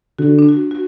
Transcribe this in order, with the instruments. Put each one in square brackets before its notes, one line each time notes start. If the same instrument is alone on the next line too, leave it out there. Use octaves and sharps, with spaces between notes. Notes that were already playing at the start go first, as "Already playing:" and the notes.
[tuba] D3 [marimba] F#4
[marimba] D4
F#4
F#4